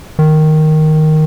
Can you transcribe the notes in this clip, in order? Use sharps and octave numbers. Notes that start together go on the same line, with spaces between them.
D#3